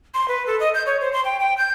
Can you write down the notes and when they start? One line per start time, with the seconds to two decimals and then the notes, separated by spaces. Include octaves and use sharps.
0.14 C6
0.28 B4
0.47 A4
0.60 D#5
0.74 G6
0.86 C#5
1.01 C5
1.13 C6
1.25 G5
1.40 G5
1.58 G6